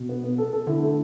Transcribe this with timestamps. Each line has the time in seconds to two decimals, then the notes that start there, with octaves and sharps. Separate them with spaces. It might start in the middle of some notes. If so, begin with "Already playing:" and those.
Already playing: B2
0.09 B3
0.24 B3
0.38 A4
0.53 A4
0.67 D3 E4
0.82 A3